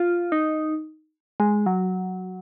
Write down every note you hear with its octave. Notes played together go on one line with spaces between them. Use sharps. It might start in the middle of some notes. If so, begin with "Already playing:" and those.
Already playing: F4
D#4
G#3
F#3